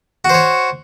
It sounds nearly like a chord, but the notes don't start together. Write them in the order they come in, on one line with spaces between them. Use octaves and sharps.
F#4 C5 C#5